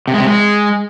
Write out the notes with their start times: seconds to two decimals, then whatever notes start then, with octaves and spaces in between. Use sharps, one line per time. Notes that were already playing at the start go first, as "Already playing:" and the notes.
0.08 C3
0.14 G#3
0.20 C3
0.27 G#3